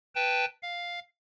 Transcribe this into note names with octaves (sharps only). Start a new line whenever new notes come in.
B4 G5 A5
F5